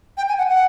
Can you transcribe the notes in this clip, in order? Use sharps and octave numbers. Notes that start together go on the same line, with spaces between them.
G5
G#5
F#5
F#5